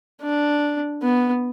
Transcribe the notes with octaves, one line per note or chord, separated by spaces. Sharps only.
D4
B3